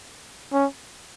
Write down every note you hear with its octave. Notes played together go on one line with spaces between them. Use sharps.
C#4